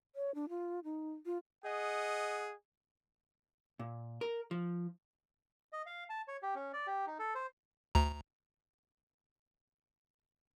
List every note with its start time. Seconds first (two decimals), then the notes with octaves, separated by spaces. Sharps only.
0.15 C#5
0.35 D4
0.49 F4
0.84 D#4
1.26 F4
1.64 G#4 D#5 F#5
3.79 A#2
4.21 A#4
4.51 F3
5.73 D#5
5.86 F5
6.10 A5
6.28 C#5
6.43 G4
6.55 C#4
6.73 D5
6.87 G4
7.07 D#4
7.19 A4
7.35 C5
7.95 D2 A#5